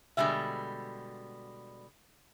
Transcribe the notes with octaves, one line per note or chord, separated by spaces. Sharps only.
B2 D3 G3 G#3 E5